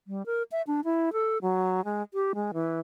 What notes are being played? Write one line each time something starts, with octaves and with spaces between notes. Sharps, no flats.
G3
A#4
E5
D4
E4
A4
F#3
G#3
G4
G#3
E3